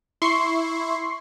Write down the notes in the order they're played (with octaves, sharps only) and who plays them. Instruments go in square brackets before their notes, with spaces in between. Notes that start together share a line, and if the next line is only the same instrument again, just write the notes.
[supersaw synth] E4 [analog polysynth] C6 C#6 C7